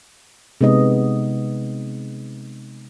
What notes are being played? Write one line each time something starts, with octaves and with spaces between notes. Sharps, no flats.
C3 G#3 B3 D#4 D#5